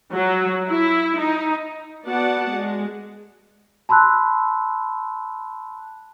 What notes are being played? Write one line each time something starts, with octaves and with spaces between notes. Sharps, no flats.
F#3
E4
D#4
B3 F#4 D5 F#5 A5
G#3
A5 B5 C6 E6 F#6